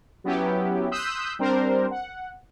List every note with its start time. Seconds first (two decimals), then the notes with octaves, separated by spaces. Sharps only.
0.24 F#3 B3 C#4 E4 G4
0.91 C6 D#6 E6 F#6 G6 B6
1.39 G3 C4 D4 A#4 C5
1.91 F#5